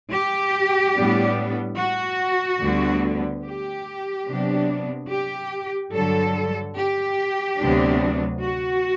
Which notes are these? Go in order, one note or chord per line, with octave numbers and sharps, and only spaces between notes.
G4
A2 G3 B3 D4
F#4
D2 D3 G3 B3
G4
C3 F#3 B3 D4
G4
G2 D3 F#3 A4
G4
D2 C3 F#3 B3 D4
F#4